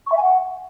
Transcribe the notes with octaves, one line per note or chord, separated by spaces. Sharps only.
C#6
E5
G#5
F#5